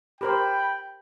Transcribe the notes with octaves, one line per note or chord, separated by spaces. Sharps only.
G4 A#4 C5 G5 B5